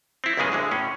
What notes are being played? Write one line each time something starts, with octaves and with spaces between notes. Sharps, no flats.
C4 E4
B1 F#2 C#3 G#3 G#4
D2 D3 G#3
A2 C#4